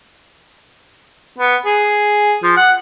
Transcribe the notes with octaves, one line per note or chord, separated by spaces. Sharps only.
B3
G#4
F3
F#5